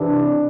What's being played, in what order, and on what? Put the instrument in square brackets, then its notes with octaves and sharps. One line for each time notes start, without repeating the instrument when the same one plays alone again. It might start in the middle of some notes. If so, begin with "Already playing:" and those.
Already playing: [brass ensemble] C3 E3 D4